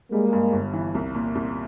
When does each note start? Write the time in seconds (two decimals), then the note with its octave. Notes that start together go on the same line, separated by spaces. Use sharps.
0.12 G3 G#3 A#3
0.33 G2
0.53 G1
0.73 E3
0.95 C2
1.15 A#2
1.35 C2